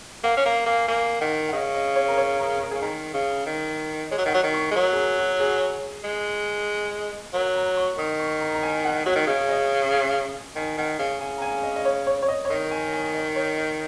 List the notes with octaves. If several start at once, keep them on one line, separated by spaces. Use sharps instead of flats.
A#3 F#5
C#4
A#3 A#5
A#3 G#5
A#3 G#5
D#3 F#5
F#5
C#3 D#5
D#5
C#5
A#4
C#5
A#4
A#4
C#3 G#4
D#3 A#4
C#3
D#3
G#3 C#5
F#3
D#3 F#5
F#3 D#5
D#3
C#6
G#3
F#3 A#4
G#4
A#4
F#4
G#4
G#3
F#3 A#4
A#5
C#6
D#3 D#6
C#6
A#5
A#5
G#5
F#5
F#3 F#4
D#3
C#3 G#4
D#5
D#3 G#5
D#3 F#5
C#3 G#5
C#3 G#5
A#5
G#5
D#5
D#5
C#5
C#5
C#5
D#5
C#5
D#3 D#5
G#5
G#5
D#5
C#5
D#5